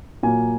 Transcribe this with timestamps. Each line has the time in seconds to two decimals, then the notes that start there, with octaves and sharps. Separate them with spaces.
0.23 A#2 F#3 A#3 G#5